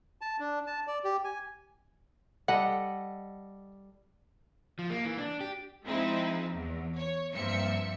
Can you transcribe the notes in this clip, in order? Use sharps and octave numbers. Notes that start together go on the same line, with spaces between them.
A5
D4
A5
D5
G4
G#5
G3 A4 D#5 F#5
F3
A#3
E3
D4
G4
F3 G#3 C4 D#4 E4
E2
C#5
G2 F3 A#3 C4 E5 C#7